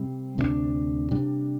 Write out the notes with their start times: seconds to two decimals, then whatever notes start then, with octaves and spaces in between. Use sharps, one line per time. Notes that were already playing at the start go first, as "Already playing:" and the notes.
Already playing: C3 G3 C4
0.38 D2 C3 G3 D4
1.11 C3 G3 D4